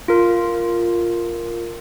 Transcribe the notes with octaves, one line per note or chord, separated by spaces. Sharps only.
F4 A#4